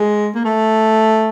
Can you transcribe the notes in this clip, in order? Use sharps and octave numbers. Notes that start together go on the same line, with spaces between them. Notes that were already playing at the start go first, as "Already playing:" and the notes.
Already playing: G#3
A#3
A3